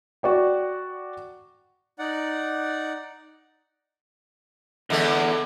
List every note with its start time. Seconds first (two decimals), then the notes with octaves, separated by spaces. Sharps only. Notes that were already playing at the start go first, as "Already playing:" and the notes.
0.23 F#4 D5 G5
1.99 D#4 D5 F#5
4.90 E2 D3 G#3 A3